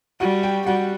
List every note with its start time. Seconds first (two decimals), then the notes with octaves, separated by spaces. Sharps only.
0.20 G3 F#4 F#5
0.43 G4 G5
0.67 G3 F#4 F#5